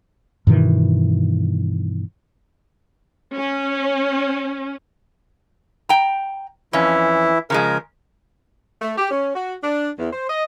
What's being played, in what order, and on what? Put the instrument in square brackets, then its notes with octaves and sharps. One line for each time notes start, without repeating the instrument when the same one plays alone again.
[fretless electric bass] G2 B2 D#3 E3
[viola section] C#4
[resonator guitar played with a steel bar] G5 A#5
[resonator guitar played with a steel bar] F2 C#4 [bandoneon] E3 E4
[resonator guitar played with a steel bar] C#3 F3 G#3 [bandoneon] A#4
[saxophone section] A3
G4
C#4
F#4
D4
E2
C5
D#5